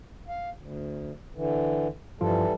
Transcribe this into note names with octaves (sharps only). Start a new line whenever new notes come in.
F5
D2
D3 E3
G2 E3 F3 G3 F4 A4